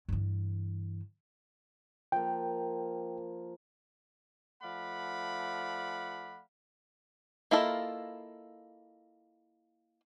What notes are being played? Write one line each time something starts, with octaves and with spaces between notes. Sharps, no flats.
G2 E3
F3 A#3 G5
F3 A3 D5 F5 F#5 B5
A#3 E4 F4 A4 D#5